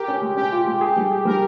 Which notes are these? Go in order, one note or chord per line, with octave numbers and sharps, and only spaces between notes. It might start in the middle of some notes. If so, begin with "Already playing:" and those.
Already playing: G4 A#4
C#4
G#3
C#4 G4
F4
G#3
G#4
G3
G#4
G3 A#4